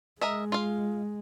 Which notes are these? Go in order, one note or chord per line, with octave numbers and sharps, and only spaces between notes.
G#3 A#4 D#5 E5
F4 F5